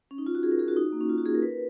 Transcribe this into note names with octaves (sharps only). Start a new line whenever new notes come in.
C#4
D#4
F4
F#4
G#4
A#4
G#4
F#4
D#4
A#3
C#4
F4
F#4
G#4
A#4
B4